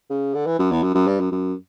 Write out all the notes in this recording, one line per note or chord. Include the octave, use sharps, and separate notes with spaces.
C#3
D3
E3
F#2
E2
F#2
F#2
G2
F#2
F#2